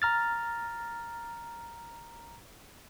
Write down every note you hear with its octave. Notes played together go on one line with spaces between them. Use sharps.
A#5 F6 A6